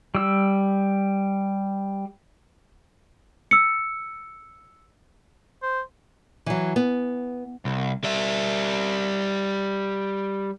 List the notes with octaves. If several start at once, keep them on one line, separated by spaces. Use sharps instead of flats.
G3 E6
E6 C#7
C5
E3 F#3
B3
C2
G3 E5